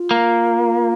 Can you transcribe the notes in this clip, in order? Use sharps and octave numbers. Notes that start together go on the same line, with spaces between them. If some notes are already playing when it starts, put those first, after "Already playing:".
Already playing: F4
A#3